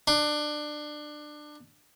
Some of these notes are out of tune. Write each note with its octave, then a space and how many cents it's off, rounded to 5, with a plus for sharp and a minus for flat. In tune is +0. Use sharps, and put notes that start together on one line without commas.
D4 +20